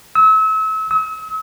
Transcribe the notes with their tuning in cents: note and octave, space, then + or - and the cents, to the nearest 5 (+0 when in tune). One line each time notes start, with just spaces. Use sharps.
E6 -35
E6 -45